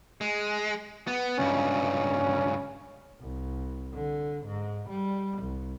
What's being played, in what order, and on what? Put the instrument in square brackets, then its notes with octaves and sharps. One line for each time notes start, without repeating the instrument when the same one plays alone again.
[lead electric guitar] G#3
B3
[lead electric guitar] C#2 G2 [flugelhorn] C#4
[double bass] C2
D3
G#2
G3
C2